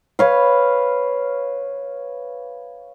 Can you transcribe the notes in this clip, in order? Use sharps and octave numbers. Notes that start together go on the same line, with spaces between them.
B4 C#5 F5